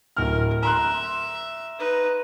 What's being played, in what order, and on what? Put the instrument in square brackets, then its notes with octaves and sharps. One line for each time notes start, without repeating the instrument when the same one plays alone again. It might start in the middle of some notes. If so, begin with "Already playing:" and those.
[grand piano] D1 F6 [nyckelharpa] A#4
[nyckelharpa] E5 [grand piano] A#5 C6 F#6
[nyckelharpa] D#4 B4